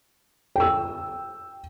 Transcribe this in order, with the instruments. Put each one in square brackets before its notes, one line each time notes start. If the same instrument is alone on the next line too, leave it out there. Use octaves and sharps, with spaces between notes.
[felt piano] G5 E6